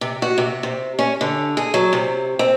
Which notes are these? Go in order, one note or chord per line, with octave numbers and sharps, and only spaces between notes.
C3
F#4
C3
C3
C#4
D3
G#4
F#3
C3
C4